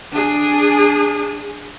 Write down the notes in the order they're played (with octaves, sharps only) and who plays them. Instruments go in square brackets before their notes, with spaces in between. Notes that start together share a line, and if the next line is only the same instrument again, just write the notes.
[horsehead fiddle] D4 G#4